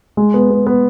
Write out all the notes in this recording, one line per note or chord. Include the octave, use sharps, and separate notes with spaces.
G#3
B3
B3
B3